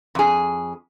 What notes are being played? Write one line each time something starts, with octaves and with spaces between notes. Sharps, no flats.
F2 G#4